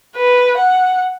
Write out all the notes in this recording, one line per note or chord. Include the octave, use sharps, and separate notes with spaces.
B4
F#5